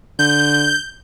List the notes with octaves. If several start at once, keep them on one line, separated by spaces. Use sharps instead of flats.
D3 G6